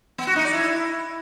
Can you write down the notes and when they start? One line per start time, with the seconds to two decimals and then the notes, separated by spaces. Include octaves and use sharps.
0.18 B3
0.27 F#4
0.36 D#4
0.44 D5
0.53 E4